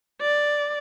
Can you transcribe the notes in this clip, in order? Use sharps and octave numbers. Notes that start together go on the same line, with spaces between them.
D5